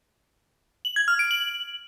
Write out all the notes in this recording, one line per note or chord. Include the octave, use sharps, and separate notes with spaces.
F#7
G#6
F6
D7
F#7